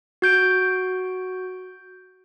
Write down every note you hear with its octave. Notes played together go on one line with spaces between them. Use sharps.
F#4 G6 D7